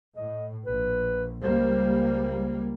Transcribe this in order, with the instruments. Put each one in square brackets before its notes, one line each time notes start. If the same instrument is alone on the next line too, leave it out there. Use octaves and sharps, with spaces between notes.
[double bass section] A2 [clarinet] D#5
[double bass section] A#1 [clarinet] B4
[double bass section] C#2 G3 A#3 [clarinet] C5